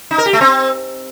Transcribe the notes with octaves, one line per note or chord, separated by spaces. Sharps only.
D#4
A#4
G4
A3
C4